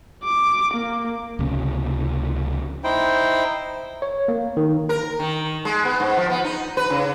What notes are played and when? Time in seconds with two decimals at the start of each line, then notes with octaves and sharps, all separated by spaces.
0.24 D6
0.74 A#3
1.39 C#2 C3 A#3 C#4
2.84 D#4 E4 C5 G5
4.02 C#5
4.28 A#3
4.57 D#3
4.89 A#4
5.19 D#3
5.65 G#3
5.85 B3
6.00 G#2
6.17 F3
6.30 B3
6.44 D#4
6.77 B4
6.90 C#3